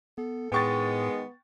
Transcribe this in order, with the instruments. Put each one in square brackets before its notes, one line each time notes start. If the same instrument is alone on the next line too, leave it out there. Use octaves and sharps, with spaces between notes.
[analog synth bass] B3 [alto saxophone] A4
[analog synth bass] A2 [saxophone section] D#3 G#3 [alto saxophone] B3 [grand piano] G5 C#6 A6